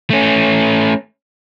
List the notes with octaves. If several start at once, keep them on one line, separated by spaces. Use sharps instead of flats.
A3 C#4